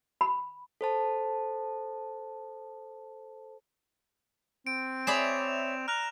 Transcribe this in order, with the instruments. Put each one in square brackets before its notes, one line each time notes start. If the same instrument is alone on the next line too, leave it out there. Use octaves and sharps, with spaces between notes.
[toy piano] B5
[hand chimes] A4 C5 A5
[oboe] C4 [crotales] D7
[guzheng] G#4 D5 B5 [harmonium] C#5 E5 [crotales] E7 F7
[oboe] A#5 [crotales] F6 F#6 F7